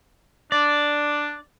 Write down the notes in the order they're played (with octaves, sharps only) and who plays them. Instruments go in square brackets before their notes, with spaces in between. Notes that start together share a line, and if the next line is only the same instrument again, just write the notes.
[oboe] D4 [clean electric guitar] D5